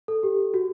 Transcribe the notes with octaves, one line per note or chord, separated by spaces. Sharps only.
A4
G4
F#4